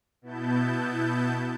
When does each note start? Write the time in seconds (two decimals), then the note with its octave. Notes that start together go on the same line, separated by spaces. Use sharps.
0.22 B2 B3 E4 A5 G6